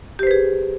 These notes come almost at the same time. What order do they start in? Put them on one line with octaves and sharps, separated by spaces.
G4 C5 B4 G#4